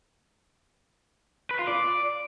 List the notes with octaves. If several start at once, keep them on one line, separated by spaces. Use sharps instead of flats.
B4
F4
D5